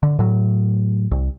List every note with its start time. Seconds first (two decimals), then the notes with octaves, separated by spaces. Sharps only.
0.03 D3
0.19 A2 F#3
1.11 C2